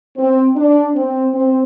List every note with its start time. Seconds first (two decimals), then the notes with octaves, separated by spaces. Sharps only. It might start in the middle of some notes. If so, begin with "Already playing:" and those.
0.17 C4
0.56 D4
0.95 C4
1.35 C4